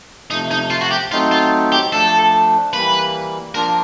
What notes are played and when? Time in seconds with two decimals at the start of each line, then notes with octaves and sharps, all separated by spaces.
0.31 C3 F3 A3 D#4
0.51 D#4
0.70 F4
0.81 F#4
0.91 G4
1.12 F#3 A3 C4 D#4 F4
1.32 F4
1.72 G4
1.92 F3 A3 D4 A4
2.73 E3 G3 A#3 B4
3.55 F3 A#3 D4 F4 A#4